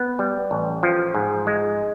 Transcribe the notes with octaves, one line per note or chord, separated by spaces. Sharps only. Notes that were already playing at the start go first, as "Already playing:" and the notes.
Already playing: B3
G3
A1
F3
G#2
G#3